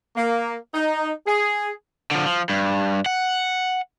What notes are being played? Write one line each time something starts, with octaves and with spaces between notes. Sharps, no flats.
A#3
D#4
G#4
D3 F3
F3
G2
F#5